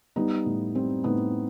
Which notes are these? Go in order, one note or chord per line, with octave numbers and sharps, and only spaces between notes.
G3 B3 D#4
A2
G3 C4
A2 B3 D#4